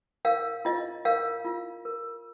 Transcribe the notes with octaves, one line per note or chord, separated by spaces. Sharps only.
A#4 F5
F4 D#5
A#4 F5
F4
A#4